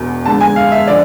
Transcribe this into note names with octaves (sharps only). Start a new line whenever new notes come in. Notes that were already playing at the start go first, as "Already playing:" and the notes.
Already playing: E1 E2 B2
F2 D3 G#3 B3 A5
G#5
F5
E5
D3 F3 D5